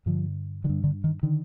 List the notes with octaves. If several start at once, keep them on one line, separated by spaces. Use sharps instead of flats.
G2 D3 F3
D3 D#3
G2
D3
D#3
D3 D#3